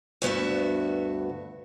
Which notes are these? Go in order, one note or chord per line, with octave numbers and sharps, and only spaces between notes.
D2 G2 B3 F#4 E5